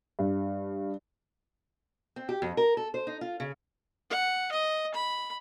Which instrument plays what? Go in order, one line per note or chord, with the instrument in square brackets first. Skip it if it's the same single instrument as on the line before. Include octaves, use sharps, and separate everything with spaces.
[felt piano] G2
[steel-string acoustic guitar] C4
G4
F2
A#4
A4
C5
D#4
F4
C#3
[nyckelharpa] F#5
D#5
B5